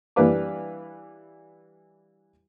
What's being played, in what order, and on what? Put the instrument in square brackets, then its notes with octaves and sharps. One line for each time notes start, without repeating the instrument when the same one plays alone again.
[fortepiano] E3 G3 D4 B4 F5 D6